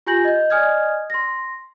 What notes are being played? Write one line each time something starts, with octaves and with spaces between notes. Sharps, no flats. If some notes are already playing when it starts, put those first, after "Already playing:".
F4 G4 G#5 G6 A#6 F#7
D#5 G6
D5 D#5 G#5 D#6 F6 G#6
C6 A#6